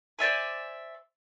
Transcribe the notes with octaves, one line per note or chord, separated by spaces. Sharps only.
C5 D5 E5 G#5